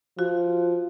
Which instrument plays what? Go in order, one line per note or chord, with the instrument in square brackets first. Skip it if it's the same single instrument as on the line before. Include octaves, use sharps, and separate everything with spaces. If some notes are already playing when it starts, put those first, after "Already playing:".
[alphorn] F3 [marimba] F#4